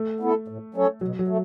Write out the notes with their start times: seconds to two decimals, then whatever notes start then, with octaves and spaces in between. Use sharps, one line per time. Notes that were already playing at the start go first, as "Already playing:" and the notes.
Already playing: A3
0.20 B3 E4 A4
0.48 A2
0.74 F#3 C#4 A4 C#5
1.01 B2 F#3
1.19 F#3
1.28 A3